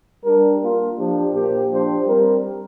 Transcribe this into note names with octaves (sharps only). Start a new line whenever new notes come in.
G3 D4 A#4
A#3 F4 A#4
F3 D4 G4
A#2 A#3 G4 C5
F3 D4 G4 C5
G3 C4 A#4